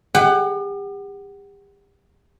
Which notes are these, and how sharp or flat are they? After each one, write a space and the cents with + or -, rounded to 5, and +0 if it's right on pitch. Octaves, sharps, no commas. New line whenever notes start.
G4 +40 F#5 +20